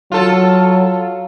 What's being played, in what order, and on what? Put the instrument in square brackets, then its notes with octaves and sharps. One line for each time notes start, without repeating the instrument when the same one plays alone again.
[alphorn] F#3 [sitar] F4 A4